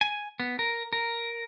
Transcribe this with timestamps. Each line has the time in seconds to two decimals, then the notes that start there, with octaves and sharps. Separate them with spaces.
0.01 G#5
0.40 B3
0.59 A#4
0.93 A#4